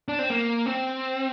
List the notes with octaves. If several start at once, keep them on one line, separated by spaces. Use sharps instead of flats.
D4
C4
A#3
C4